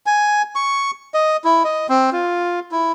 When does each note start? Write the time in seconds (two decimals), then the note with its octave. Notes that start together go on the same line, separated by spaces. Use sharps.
0.06 G#5
0.55 C#6
1.14 D#5
1.44 E4
1.64 D#5
1.89 C4
2.13 F4
2.72 E4